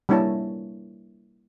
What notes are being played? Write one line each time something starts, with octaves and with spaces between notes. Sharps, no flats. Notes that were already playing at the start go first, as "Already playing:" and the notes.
G3 A#3 D4 E4 C#5 A5